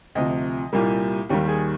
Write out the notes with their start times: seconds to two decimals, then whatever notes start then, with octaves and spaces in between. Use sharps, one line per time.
0.15 D2 C3 F3 D#5
0.72 C2 A#2 G3 A#3
1.29 D#2 D#3 G3 G4
1.48 G#4